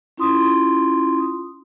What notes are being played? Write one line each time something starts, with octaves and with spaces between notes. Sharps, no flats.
C#4 E4 F4 C6 D#6